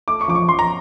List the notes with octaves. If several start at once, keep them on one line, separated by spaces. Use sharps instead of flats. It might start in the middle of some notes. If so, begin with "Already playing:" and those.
A3 D6
C#6
F3 D6
C#6
F3 C6
A#5